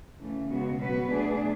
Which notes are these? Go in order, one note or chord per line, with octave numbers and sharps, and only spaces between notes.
C#3 E3 A3
C#3 G#3 B3 F#4
B2 F#3 B3 F#4 B4
A3 D4 G#4